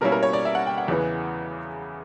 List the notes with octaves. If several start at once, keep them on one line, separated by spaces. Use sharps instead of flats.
B2 G3 A#3 C#4 E4 A#4
A#4
C#5
D5
E5
F#5
G5
F#5
E2 C#3 E3 B3